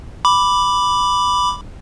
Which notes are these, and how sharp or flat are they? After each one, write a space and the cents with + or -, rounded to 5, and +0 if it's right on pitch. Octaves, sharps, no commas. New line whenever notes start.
B5 +0 D6 +0